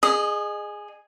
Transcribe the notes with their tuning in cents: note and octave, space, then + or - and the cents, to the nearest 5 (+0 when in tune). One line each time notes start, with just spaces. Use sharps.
G#4 +0 D#5 -30